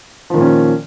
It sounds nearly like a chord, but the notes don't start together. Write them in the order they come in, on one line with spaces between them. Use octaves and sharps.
F3 D#3 A#2 C#4